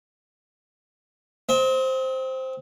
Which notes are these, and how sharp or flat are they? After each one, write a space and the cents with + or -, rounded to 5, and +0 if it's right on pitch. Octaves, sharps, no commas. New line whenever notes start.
C4 +5 D#5 +45